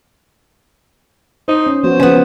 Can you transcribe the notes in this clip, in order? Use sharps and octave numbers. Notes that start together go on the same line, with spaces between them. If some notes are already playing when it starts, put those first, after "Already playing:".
D#4 C5
C#4
F3 B3 F#4 C5
C#3 F3 B3 C#4